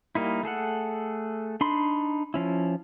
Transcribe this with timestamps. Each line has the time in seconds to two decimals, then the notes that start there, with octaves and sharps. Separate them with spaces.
0.15 G3 A#3 D#4 E4
0.43 A3 G#4 A4 F#5
1.61 D4 D#4 B5 C6
2.34 F3 C#4 E4